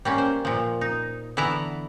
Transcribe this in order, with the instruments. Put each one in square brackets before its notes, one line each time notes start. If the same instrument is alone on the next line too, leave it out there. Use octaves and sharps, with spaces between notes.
[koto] G3 A#3 C#4
C5
A#2 F3
D#4
D3 E3 B3 E4 A5 A#5